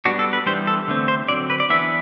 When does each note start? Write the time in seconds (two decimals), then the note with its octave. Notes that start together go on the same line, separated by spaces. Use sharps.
0.05 G3 B3 D4 F#4
0.19 A4
0.33 B4
0.46 E3 G3 B3 D4 C5
0.67 A4
0.88 D3 A3 C4
1.08 C5
1.28 D3 F#3 C4 D5
1.50 B4
1.60 D5
1.70 E3 B3 D4 E5